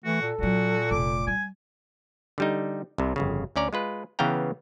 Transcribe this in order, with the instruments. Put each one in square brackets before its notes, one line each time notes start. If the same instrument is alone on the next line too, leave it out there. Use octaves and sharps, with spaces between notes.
[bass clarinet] E3 [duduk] A3 [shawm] F#4
[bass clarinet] A#2 [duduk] A4
[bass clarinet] A#2 [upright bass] F3 F#3 [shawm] F#4
[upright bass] F1 C3 [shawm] D6
[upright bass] G3 [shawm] G#5
[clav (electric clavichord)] D3 G3 D#4
C2 C3
G1 F2 C#3
D2 C#4 D5 A#5
G#3 F4 B4
C#3 E3 B3 F5 G5 A#5